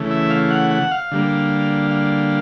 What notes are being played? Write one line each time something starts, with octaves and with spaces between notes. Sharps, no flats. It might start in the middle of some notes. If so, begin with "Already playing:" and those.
Already playing: C#3 E3 A3
E5
F5
F#5
F#5
F5
D3 G3 A#3
F5